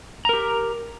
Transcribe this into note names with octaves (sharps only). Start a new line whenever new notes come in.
G4 A#4 A#5